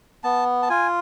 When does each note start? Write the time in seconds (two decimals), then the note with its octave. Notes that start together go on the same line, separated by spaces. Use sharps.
0.24 B3 A5
0.62 A5
0.69 F4 G#5